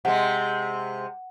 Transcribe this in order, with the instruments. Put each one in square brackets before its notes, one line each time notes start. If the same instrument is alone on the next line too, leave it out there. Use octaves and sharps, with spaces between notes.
[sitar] C3 G#3 [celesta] F#5